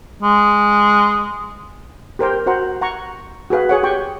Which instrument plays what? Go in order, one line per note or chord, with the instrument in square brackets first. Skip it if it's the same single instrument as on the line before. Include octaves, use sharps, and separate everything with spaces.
[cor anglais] G#3
[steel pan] G4 A#4 C5 G5
F#4 C5 F#5 A#5
F#5 A#5 C#6
F#4 G#4 B4 F5
G#4 C#5 F#5
G4 G5 C#6